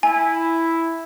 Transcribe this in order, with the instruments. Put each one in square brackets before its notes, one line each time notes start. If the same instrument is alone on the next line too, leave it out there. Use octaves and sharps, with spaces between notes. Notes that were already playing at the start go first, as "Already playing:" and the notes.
[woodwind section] E4 [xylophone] G#5